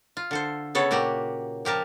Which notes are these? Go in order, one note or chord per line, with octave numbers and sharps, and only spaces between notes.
F4
D3 A4 C5
C#3 B3 A4 C#5
A#2 A#3 F#4 G4 F#5
F3 G4 A#4 A5